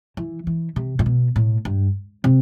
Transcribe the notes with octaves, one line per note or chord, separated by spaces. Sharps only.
E3
E3
C3
A2
B2
A2
G2
C3